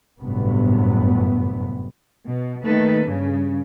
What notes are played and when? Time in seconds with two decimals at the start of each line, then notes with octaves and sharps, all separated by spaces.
0.19 G1 F#2 A2 C3 B3
2.26 B2
2.64 D#3 A3 A#3 A4 B4
3.04 G2 C#3